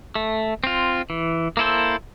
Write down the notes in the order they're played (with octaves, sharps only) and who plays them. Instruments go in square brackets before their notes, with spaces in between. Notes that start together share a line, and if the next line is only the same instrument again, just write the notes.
[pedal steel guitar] A3
C4 F4
E3
A#3 E4 A4 C5